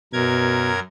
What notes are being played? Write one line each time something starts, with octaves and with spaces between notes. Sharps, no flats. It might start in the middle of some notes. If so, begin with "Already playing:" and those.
F#2 B2 A#4 G#6